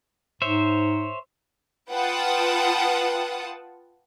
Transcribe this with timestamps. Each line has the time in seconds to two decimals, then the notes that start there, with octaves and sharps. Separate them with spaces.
0.42 G#2 C5 C#5 E5
1.91 F4 B4 F#5 G5 A5 D#6